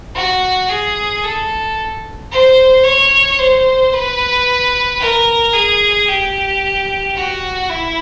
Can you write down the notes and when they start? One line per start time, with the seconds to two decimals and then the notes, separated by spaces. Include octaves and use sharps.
0.15 F#4
0.69 G#4
1.24 A4
2.31 C5
2.84 C#5
3.38 C5
3.93 B4
5.00 A#4
5.53 G#4
6.08 G4
7.16 F#4
7.69 E4